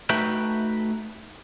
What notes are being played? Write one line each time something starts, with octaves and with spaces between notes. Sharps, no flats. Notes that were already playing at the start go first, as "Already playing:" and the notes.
A3 D#4 F#4 B4 E5 G5